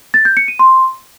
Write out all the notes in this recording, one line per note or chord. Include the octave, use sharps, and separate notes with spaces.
A6
G6
C#7
D#7
C6